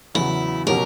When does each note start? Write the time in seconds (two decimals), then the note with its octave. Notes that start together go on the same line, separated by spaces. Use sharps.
0.15 E2 C#3 F#3 E4
0.67 B2 F#3 C#4 G4 A#4